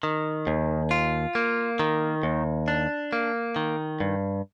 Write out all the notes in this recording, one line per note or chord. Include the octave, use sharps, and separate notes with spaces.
D#3
D#2
F4
A#3
D#3
D#2
D4
A#3
D#3
G2